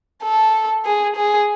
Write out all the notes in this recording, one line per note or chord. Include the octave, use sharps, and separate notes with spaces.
A4
G#4
G#4